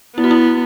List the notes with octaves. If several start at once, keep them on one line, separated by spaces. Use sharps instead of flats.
B3 E4
F#4
E4